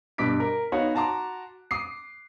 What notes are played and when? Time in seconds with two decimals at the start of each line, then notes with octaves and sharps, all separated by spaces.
0.18 G2 B2 D6 B6 D7
0.40 A#4
0.72 B3 D#4 F#4 C#5 F5 F#5
0.95 F#4 A5 A#5 C6 D6
1.71 D6 D#6 C7